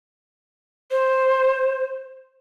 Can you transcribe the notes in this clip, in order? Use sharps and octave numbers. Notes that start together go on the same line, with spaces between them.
C5